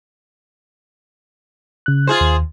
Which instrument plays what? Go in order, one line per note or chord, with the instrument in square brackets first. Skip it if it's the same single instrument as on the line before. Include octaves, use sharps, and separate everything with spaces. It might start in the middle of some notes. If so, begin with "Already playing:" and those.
[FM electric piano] C#3 F#6
[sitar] F4 G#4 C5
[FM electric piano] D#2